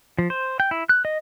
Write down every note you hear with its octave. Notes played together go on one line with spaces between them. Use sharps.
F3
C5
G5
E4
F#6
D#5